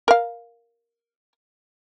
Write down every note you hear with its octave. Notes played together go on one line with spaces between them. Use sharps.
A#4 F5